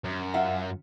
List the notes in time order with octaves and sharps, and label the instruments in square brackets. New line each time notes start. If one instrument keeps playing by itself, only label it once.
[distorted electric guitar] F#2
[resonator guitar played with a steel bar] F4 E5 F#5